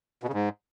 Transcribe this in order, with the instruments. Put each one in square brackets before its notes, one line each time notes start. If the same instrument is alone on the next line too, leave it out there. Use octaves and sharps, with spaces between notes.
[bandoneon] B2
C#3
G#2